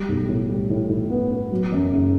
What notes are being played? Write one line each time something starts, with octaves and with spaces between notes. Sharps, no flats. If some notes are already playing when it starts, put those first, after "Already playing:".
Already playing: G3
B1
A2
G3
A2
A2
B3
B3
F#3
F#2
F#1